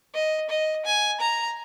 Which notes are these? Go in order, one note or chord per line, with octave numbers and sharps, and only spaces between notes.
D#5
D#5
G#5
A#5